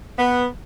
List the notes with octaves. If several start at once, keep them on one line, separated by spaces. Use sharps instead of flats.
B3